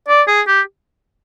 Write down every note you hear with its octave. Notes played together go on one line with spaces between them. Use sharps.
D5
G#4
G4